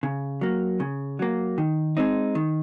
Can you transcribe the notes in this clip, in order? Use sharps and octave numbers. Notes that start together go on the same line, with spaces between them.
C#3
F#3 A#3
C#3
F#3 A#3
D#3
G#3 C4 D#4
D#3